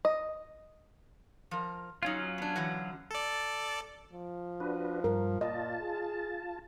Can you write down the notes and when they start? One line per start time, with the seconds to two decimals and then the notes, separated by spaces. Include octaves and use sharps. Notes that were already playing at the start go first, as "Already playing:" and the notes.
0.05 D#5
1.51 F3 A#4
2.03 F#3 C#4 D#4 F4 F5
2.38 B3 D4
2.56 D3 E3 F#4
3.11 A4 D5
4.13 F3
4.60 D4 F#4 B4
5.04 G2 A#4
5.41 A#2 F4 D#5 A5
5.80 G#4